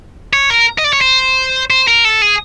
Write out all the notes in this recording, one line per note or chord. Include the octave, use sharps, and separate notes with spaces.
C#5
A#4
D#5
D5
C#5
C5
C5
A#4
A4
G#4